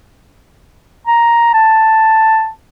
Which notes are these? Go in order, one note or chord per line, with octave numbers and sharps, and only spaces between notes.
A#5
A5